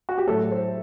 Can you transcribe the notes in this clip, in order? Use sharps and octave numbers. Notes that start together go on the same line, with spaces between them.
F#4
G4
A2 F#3 A3 A4
C5